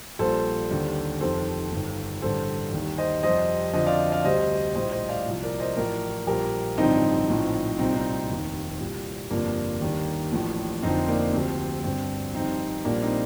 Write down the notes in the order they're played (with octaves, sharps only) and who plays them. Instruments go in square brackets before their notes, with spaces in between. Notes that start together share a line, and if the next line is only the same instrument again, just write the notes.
[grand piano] A#1 A#2 G3 A4 C5
D#2 D3 G3
F1 F2 C3 D#3 A4 C5
G1 G2 D#3
A1 G2 D3 A4 C5
D#2 D#3 G3
C5 D#5
F2 C3 G3 C5 D#5
F2 D3 F3 C5 D#5
D5 F5
D5 F5
D2 C3 G3 C5 D#5
A#1 A2 G3 C5 D#5
C5 D#5
D5 F5
C2 A#2 F3
A#4 D5
C5 D#5
A1 A2 F3 A#4 D5
A#1 A#2 G3 G4 A#4
A1 G2 D3 F3 C4 D#4
A#1 A2 F3
C2 A#2 G3 C4 D#4
C4 D#4
F1 D#2 D#3
C2 A#2 G3
G1 F2 C3 F3 A#3 D4
D#2 D#3 G3
A1 A2 F3
F1 F2 D3 F3 C4 D#4
A#3 D4
D2 C3 F3 C4
G1 G2 D3 C4
F1 F2 D#3 G3 C4 D#4
A#1 A#2 G3 A#3 D4
C4 D#4